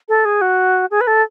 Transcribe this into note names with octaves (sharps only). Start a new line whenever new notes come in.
A4
G#4
F#4
G#4
B4
A4